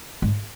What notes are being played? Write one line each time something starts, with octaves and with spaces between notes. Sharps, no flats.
G#2